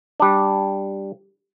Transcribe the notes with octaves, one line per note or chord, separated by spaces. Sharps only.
G3 D4